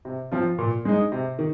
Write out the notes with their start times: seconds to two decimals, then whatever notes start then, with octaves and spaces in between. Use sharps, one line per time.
0.05 C3
0.32 F3 C4 F4
0.59 A#2
0.85 G#3 D#4
1.12 C3
1.39 D#3